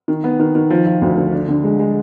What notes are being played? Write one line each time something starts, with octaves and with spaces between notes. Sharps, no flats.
D#3
B3
D#3
D#3
F3
F3
D2
D3
D4
D3
G#3
G#3